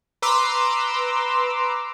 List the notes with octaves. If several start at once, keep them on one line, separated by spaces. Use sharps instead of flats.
B4 A#5 C6 D6 E6